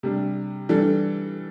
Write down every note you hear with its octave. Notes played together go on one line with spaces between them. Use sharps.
C3 G3 D4
E3 G3 D4 A4